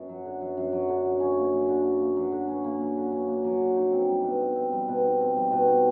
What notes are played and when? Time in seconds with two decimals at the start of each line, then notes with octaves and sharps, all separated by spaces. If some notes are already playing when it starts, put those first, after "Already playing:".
Already playing: F#2
0.09 F#3
0.25 D3
0.41 F#2
0.57 F#2
0.72 F#3
0.89 D3
1.05 F#2
1.20 C#4
1.37 A#3
1.53 F#3
1.68 D3
1.84 C#4
2.01 A#3
2.17 F#3
2.32 D3
2.48 C#4
2.64 A#3
2.80 F#3
2.97 D3
3.12 C#4
3.28 A#3
3.44 F#3
3.60 D3
3.76 D#4
3.92 C4
4.07 G3
4.24 B2
4.40 D#4
4.55 C4
4.72 G3
4.88 B2
5.04 D#4
5.20 C4
5.36 G3
5.51 B2
5.67 D#4